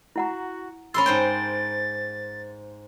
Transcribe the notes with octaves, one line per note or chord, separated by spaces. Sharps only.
E4 F#4 F#5 A#5
C#4 A#4 B5 C6 E6 A6
G#2 C5 G5